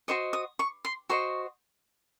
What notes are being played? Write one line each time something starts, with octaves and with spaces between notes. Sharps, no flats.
F#4 C5 D#5 C#6
D#6
C#6
C6
F#4 C5 D#5 C#6